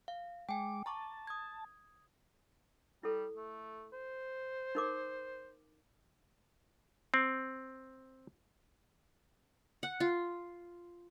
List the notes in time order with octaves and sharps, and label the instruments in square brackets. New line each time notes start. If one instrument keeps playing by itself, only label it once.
[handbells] F5
[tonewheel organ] G#3 D6 [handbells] G5 G#5
[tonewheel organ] A5 [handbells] A#5 C#6 D6
[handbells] D#6 G#6
[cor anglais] G3 [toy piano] E4 A4
[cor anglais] A3
C5
[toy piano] D#4 A#4 D6
[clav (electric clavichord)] C4
[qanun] F#5
F4